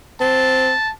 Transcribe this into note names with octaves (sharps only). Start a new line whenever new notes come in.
C4 A5